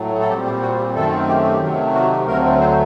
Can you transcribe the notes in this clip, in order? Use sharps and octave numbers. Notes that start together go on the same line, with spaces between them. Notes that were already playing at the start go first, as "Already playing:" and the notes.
Already playing: A2 F#3 A3
A4
A#2 G3 C4 G4
G4
F#4
G4
F#2 D#3 A3 C4 A4
G4
G4
C3 D#3 F#3 A3
F#4
G4
D2 D3 F#3 A3 A#3 C4 A#4
C4 C5